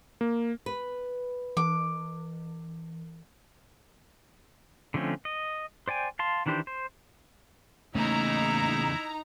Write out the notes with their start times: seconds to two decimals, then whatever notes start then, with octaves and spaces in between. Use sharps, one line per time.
0.21 A#3
0.66 B4
1.57 E3 D6
4.94 D3 F3 A3 C4 C#4
5.25 D#5
5.88 C5 D5 G5 G#5
6.19 F5 A5 C6
6.46 D#3 E3 D4 G4 C5
6.67 C5
7.95 E2 C#3 A3 A#3 D#4 E4 A#5